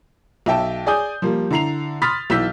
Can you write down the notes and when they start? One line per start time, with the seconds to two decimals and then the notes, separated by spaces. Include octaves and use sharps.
0.46 B1 E5 G5 A5
0.86 G#4 D5 G#5 D#6 G6
1.22 F3 G3 A#3
1.50 D3 E4 A#5 C7 F7
2.02 B5 C6 D#6 F6 A6 B6
2.30 B1 E3 E6 G6 B6